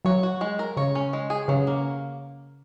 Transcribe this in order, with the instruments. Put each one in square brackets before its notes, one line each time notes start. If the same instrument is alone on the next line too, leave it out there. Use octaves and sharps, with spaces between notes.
[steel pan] F#3 [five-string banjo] C#5
[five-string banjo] F#4
G#3
A#4
[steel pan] C#3 [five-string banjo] C#5
[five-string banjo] C#4
G#3
G#4
[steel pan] C#3 [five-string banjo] F#3
[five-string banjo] A#3